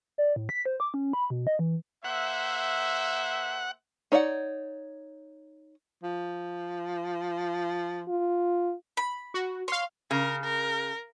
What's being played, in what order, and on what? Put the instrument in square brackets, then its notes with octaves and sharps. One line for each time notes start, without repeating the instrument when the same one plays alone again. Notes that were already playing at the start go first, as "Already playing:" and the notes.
[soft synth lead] D5
A2
B6
C5
D6
C#4
B5
B2
D#5
E3
[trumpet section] A#3 C5 E5 [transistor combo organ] F#5
[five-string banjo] D#4 C#5 D5 E5 F#5
[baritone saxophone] F3
[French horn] F4
[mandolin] B5
[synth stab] F#4
[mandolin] C#5 [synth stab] F5 C6
[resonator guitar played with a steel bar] C#3 [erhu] A#4
[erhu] A#4